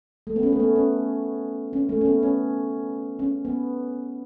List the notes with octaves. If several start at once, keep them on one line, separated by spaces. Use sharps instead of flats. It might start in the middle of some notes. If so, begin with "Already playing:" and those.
A3
B3
C#4
A3
B3
C#4
C#4
A3
C#4
B3
C#4
C#4
B3